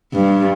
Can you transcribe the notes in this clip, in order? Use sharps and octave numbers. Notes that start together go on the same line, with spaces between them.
G2